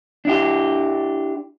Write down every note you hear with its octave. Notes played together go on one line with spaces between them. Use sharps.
D4 E4 G4